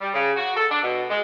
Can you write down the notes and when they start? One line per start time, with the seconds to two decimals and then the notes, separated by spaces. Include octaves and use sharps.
0.01 G3
0.14 C#3
0.36 F#4
0.57 A4
0.71 D4
0.84 B2
1.10 G#3